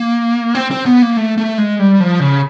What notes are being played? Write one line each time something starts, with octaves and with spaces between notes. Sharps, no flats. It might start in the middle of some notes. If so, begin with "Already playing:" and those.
Already playing: A#3
C4
C4
B3
A#3
A3
A3
G#3
G3
F3
C#3